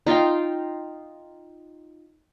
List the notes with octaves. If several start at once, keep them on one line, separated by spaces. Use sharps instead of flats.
D#4 F4 F5 G5